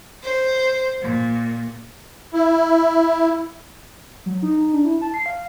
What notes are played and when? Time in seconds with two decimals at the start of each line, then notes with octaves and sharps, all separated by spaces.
0.24 C5
1.01 A#2
2.33 E4
4.26 F#3
4.42 D#4
4.60 D#4
4.73 D4
4.85 E4
5.01 A5
5.14 C7
5.26 F5